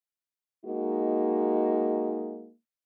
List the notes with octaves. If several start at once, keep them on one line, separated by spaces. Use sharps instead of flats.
G#3 A#3 D#4 F#4